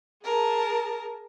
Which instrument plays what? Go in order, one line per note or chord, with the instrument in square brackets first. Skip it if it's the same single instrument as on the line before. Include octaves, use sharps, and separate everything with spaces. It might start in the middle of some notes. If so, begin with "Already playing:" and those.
[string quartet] G#4 A#4 A5